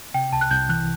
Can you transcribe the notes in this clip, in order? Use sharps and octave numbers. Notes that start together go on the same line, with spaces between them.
C3 G5
C2 A5
F#6
C2 G6
E3 F#6